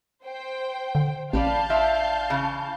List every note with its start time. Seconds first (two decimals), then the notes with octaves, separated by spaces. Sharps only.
0.25 C5 G5
0.95 D3
1.33 A1 G4 B4 D5 F5 A5 G6
1.70 F3 D4 E5
2.30 C#3 E3